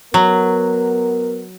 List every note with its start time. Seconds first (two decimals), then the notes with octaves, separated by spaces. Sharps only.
0.14 F#3 B3 A#4